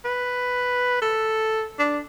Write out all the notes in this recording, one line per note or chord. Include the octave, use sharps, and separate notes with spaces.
B4
A4
D4